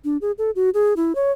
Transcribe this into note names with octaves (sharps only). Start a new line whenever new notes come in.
D4
G#4
A4
F#4
G#4
E4
C#5